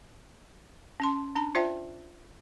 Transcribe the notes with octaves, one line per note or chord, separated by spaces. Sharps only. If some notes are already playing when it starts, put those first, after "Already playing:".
C#4 A5 C6
D4 A5 B5
F4 C5 D5 E5 G5 A5